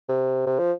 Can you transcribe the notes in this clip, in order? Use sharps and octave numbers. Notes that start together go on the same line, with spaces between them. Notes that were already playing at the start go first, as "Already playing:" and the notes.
C3
C3
F3